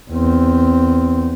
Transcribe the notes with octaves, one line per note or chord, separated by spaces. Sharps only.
E2 C4